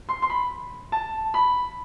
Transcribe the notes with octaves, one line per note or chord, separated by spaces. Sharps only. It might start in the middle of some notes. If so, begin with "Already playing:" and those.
C6
C6
B5
A5
B5